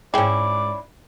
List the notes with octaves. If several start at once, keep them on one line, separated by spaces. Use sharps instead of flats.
D2 G#2 C#4 E4 G#4 D5 G5